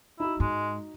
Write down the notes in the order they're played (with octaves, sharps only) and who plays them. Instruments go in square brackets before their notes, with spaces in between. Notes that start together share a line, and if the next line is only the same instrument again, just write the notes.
[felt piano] D#4 F#4 [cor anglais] E4
[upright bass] G#2 [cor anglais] G#3